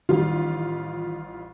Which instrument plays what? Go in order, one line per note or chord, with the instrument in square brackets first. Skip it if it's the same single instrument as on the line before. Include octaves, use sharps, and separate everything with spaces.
[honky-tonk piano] A1 G3 F4 [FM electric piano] D#3